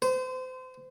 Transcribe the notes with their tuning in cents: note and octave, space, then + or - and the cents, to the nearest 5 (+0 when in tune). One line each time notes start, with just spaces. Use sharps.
C5 -30